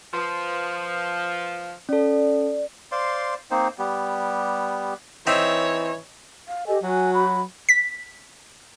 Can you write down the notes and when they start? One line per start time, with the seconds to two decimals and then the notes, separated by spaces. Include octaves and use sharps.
0.13 F3 B4 C6
1.89 C#4 A4 D5
2.92 C5 D5 F5 C6
3.51 A#3 C4 D#4 C5
3.79 G3 B3 G4
5.27 E3 C4 D#4 E4 C#5
6.48 F5
6.67 G4 A4 D#5 G#5
6.83 F#3 F#4 G#5
7.15 B5
7.69 B6